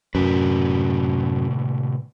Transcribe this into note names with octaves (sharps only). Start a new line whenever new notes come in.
F#2 A2 C3 B4